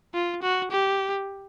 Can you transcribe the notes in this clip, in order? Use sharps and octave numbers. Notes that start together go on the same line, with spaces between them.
F4
F#4
G4